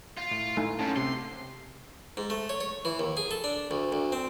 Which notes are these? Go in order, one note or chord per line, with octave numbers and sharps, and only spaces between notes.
F4
A2
A3 D#4 E4 G#5
G#2 C#4 A5
C3 C6
G#2
A3
C#5
C#5
E3
D#2
G#4
A4
D4
D2
D2
C4